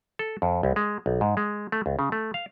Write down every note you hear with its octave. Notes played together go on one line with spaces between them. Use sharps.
A4
F2
C2
G#3
B1
G#2
G#3
A3
C#2
C#3
A3
F5